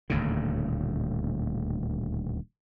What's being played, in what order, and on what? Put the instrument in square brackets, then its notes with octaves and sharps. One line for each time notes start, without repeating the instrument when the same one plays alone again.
[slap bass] D#1 D2 A2 C#3